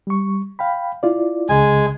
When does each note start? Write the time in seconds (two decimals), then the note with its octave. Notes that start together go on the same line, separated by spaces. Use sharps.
0.07 G3 C#6
0.59 F5 G5 B5
1.03 E4 F4 D5
1.49 C#2 C#3 G#3 G#5